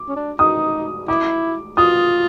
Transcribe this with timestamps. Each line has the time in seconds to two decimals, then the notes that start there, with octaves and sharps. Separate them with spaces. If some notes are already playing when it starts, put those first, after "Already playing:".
Already playing: D6
0.09 C#4
0.16 D4
0.39 D#4 D#6
1.08 E4 D6
1.77 F4 D#6